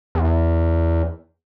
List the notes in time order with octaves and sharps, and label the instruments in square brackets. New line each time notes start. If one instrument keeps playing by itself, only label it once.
[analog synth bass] E2